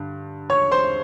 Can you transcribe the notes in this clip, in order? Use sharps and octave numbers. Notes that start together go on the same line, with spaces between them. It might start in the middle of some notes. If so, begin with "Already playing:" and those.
Already playing: G2 D3
C#5 C#6
C5 C6